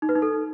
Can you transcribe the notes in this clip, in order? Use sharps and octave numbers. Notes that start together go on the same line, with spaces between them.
D#4
B4
D#4
A4